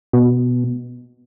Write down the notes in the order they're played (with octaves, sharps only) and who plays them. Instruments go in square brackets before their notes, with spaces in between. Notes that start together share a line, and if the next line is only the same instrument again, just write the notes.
[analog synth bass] B2